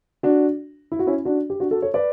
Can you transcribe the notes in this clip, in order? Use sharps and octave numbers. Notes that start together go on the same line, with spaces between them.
D4 F#4
E4
F#4
C#4 E4
D4 F#4
G4
D4 F#4
F#4 A4
A4 C#5
B4 D5